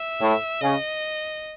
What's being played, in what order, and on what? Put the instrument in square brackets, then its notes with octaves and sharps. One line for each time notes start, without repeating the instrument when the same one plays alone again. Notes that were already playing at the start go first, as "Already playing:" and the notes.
Already playing: [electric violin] E5
[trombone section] A2
[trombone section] C#3 [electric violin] D#5